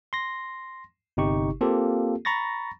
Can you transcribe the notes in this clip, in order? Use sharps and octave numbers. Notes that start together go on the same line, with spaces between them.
C6 A#6
G1 C3 D#4 G4 C#6
A#3 C4 F4 G4 A4
A#5 B5 C#6 A6 A#6